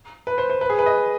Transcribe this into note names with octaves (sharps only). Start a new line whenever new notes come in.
B4
C5
C5
B4
G#4
B4
D#5